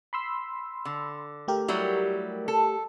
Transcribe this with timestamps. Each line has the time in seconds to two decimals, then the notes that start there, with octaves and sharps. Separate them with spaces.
0.13 B5 C6 E6
0.85 D3
1.48 A3 G4 A#4
1.68 F#3 G3 E4
2.48 A4